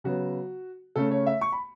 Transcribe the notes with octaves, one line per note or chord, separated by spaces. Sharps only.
C#3 F#3 B3 F#4
C#3 A3 C#4 A4
C#5
E5
C#6
B5